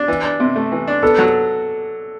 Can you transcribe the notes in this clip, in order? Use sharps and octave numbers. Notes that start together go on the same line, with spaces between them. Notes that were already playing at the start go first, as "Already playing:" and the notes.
Already playing: D4
E3
D4
C3
A3
E3
D4
B3 A4
F#3